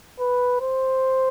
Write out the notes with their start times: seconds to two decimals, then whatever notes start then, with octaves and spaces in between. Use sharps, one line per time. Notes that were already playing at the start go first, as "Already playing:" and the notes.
0.20 B4
0.61 C5